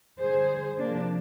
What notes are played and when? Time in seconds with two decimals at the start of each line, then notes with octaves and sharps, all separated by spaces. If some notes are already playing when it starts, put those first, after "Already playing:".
0.21 D3 G3 G#4 C5
0.78 C3 F3 A#3 D4